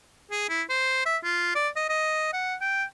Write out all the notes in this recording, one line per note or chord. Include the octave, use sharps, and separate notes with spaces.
G#4
E4
C5
E5
F4
D5
D#5
D#5
F#5
G5